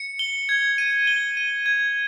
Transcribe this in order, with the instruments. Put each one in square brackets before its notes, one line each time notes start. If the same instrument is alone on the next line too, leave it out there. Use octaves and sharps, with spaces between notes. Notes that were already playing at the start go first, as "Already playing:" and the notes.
Already playing: [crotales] C#7
G7
G#6
D#7
G7
D#7
G#6